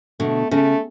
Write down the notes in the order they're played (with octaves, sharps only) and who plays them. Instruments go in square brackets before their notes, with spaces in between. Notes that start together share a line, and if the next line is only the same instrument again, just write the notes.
[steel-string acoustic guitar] B2 D3 [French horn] A3
[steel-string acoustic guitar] C#3 [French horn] A3